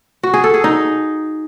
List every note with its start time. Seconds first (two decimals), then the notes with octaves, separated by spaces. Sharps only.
0.23 F#4
0.34 G#4
0.44 A4
0.54 G#4
0.64 D#4